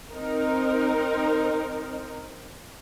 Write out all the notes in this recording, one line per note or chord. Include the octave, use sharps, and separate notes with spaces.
C4 D#4 A#4